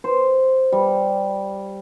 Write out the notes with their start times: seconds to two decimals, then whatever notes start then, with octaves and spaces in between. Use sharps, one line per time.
0.04 C5
0.72 G3